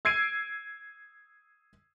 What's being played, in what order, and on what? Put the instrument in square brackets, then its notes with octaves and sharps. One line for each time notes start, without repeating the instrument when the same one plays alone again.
[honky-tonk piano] E6 G#6 C7 D7 D#7